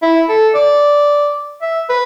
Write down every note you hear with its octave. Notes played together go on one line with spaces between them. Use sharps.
E4
A4
D5
E5
B4